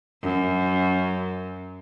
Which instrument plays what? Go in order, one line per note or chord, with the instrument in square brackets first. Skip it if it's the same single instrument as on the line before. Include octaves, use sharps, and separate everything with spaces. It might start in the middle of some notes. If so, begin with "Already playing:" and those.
[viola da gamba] F#2